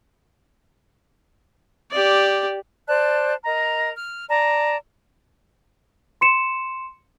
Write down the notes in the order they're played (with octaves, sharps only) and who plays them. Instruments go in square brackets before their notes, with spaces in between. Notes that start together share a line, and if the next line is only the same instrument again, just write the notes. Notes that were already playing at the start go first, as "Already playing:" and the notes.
[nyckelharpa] G4 D5
[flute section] C5 D5 A5 F#6
A#4 D#5 A#5
F6
D5 A5 A#5
[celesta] C6 C#7 E7